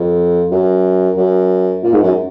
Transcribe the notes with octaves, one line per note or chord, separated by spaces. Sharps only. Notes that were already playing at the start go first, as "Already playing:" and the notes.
Already playing: F2
F#2
F#2
A#2
G#2
F#2